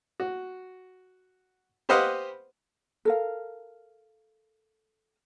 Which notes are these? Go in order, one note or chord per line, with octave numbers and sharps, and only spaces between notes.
F#4
G4 B4 C5 D#5 F5 F#5
A4 A#4 F5